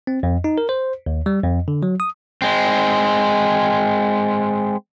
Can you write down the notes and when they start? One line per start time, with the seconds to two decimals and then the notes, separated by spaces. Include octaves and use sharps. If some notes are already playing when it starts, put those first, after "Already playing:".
0.07 C4
0.23 F2
0.44 D#4
0.58 A#4
0.69 C5
1.06 D#2
1.26 G3
1.43 F2
1.68 D3
1.83 F#3
2.00 D#6
2.42 G#3 C4